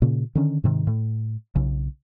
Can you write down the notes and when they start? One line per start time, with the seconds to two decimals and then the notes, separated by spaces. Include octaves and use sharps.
0.02 A#2 C#3
0.35 D3 D#3 C#4
0.64 G#2 C3 D#3
0.87 A2
1.55 B1 C#3